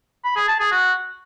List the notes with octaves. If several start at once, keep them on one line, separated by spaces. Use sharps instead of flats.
B5
G#4
A5
G#4
F#4